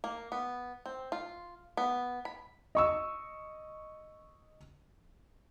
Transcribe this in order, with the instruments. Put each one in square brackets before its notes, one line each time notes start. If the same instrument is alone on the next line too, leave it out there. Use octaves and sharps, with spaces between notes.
[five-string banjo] A#3
B3
C4
F4
B3
B5
[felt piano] D#5 C#6 E6